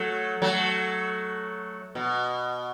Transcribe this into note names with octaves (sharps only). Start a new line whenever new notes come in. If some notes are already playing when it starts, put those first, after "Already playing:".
Already playing: F#3 A3
F#3 A3
B2